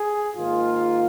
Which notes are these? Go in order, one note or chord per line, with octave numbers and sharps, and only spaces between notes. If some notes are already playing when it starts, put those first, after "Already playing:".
Already playing: G#4
G#2 D#3 A#3 F4